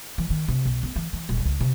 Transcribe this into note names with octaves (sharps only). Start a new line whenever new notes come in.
E3
D#3
C3
B1
B3
E3
E3
D#1
C#2
C3